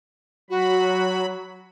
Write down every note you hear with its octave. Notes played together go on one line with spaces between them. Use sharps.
F#3 F#4 B5